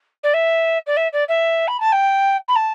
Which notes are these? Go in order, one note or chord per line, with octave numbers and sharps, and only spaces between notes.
D5
E5
D5
E5
D5
E5
B5
A5
G5
B5
A5